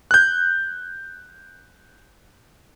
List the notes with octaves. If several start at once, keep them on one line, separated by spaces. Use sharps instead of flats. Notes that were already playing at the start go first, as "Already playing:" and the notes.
F#6 G6